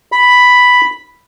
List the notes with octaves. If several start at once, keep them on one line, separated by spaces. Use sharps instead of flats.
B5